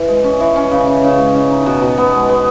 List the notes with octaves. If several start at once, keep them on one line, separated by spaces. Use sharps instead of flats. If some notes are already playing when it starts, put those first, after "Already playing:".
Already playing: E3
G#3
C#4
E3
C#4
C#3
C#3
C#3
G#3
C#3
D#4
B2
B2
B3
G#3
B3